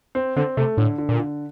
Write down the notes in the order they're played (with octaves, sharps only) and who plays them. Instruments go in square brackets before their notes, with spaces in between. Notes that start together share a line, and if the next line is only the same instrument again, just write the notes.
[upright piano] C4
[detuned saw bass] D3 [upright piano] C4
[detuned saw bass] C3 [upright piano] A3
[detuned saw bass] A2 [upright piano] D3
[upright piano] D3
[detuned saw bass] A#2
[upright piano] D3